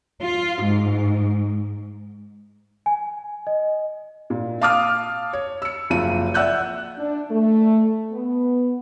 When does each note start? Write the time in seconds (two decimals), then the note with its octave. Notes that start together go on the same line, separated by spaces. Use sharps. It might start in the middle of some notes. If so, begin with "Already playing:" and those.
0.23 F4
0.63 G#2
2.86 G#5
3.47 D#5
4.30 A#2
4.61 F5 A5 D6 D#6 F6
5.33 C#5
5.62 E6 C#7
5.90 F#1 F3 D#7
6.34 D5 E5 F#5 E6 F#6 G6
6.98 D4
7.31 A3
8.12 B3